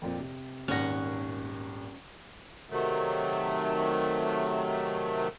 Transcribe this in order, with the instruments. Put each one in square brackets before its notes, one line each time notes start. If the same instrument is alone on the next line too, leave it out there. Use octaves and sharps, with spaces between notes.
[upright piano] F2 A#2 C4
C3
[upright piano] D#1 G#1 A#6 [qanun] C#4 F#5
[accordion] C3 D#3 F#3 A3